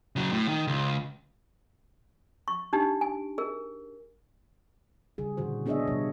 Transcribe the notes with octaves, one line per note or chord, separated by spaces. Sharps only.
C#3 F#3
A2
D#3
C#2
C#6
D4 D#4 G4
G#5
G#4 A#4
C#3 G3 G#4
A#2 D3 E3 F#4 C5
B3 D4 G#4 C#5 D#5 E5
C3 G3 C#5